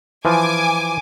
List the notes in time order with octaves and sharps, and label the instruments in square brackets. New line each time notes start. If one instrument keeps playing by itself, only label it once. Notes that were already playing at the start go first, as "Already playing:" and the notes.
[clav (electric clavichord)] E3 F3 F4 [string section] G#5 D6